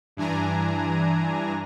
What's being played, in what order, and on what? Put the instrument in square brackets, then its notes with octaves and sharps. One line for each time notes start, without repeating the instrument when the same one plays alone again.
[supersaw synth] G2 E3 D4 G#5 A#5